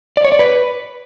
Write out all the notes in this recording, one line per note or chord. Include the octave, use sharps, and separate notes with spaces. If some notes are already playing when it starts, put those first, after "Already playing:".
D5
C#5
D5
B4